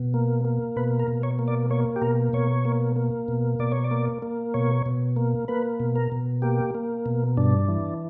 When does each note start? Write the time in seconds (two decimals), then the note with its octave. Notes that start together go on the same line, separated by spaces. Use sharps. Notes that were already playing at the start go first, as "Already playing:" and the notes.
Already playing: B2
0.14 A#3
0.45 A#3
0.76 B2 B4
0.99 A#4
1.08 B2
1.23 C#5
1.39 A#3
1.48 D5
1.70 A#3 C#5
1.96 G4
2.02 B2 A#4
2.33 B2 C#5
2.65 A#3
2.96 A#3
3.28 B2
3.59 B2 D5
3.72 C#5
3.84 D5
3.91 A#3
4.22 A#3
4.54 B2 C#5
4.86 B2
5.16 A#3
5.48 A#3 B4
5.80 B2
5.95 A#4
6.12 B2
6.42 A#3 G4
6.75 A#3
7.06 B2
7.37 G2 D4
7.68 E3